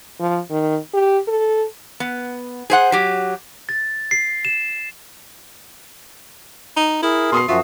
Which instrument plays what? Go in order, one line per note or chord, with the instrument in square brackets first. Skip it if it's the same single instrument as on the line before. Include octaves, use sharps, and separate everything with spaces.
[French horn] F3
D#3
G4
A4
[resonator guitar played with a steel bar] B3
G#4 C5 F#5
F#3 G4
[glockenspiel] A6
C7
E7
[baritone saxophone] D#4
[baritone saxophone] E4 [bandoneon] G#4 A#4
[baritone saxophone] B2 [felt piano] C6 D#6 C7
[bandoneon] F#2 F3 F#4 [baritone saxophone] F4 [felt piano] E5